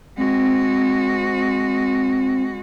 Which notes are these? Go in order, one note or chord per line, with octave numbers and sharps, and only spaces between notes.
G#3 C4 F#4